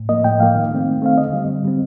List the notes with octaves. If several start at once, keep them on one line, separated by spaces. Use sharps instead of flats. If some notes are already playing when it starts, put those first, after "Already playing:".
Already playing: A2
F3 A#3 D#5
A2 G5
F3 A#3 F5
D#3
A3 C4
D#3
A3 C4 F5
D3 D#5
G3 C4
D3
G3 C4